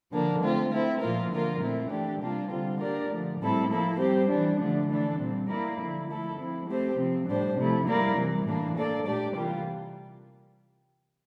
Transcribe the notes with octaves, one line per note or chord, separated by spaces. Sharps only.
D3 F3 A#3 D4
A3 C4 F4
A3 C4 E4
A#2 F3 A#3 F4 A#4
D3 F3 A#3 F4 A#4
A#2 A3 C4 E4
E3 A3 D4 G4
C3 G3 A#3 D4 F4
D3 G3 C4 F4
A#3 D4 G4 A#4 D5
D3 F3 A3
A2 G3 C4 E4 A4
F3 A#3 E4 A4
G3 C4 G4 C5
E3 G3 D4
D3 F3 A3 D4
E3 A3 D4 A4
A#2 G3 C4
A#3 E4 A#4 D5
D3 F3 A#3 E4
F3 A3 E4 A4
F3 C4 E4
A3 C4 G4 C5
C3 F3 C4
A2 G3 D4 G4 C5
C3 F3 A3 E4
G3 A#3 E4 A#4 D5
C3 E3 G3
A2 E3 A#3 D4
A#3 D4 A4 D5
A#2 A3 D4 G4 D5
C3 E3 G3 A#3 F4